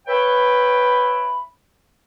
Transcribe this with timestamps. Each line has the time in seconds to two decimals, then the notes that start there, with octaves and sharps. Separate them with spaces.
0.08 B4 C#5 E5 G5 B5